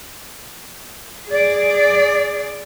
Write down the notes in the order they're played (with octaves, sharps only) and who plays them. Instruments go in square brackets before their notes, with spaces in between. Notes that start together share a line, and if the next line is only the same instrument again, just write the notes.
[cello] G#4 D5